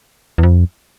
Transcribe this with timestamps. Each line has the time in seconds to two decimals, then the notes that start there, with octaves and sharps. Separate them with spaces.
0.38 E2
0.43 F2